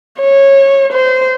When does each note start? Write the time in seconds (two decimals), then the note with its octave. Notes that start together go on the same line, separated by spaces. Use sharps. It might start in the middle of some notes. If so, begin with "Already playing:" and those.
0.20 C#5
0.93 C5